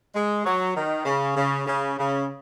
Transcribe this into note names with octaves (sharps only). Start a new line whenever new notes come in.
G#3
F#3
D#3
C#3
C#3
C#3
C#3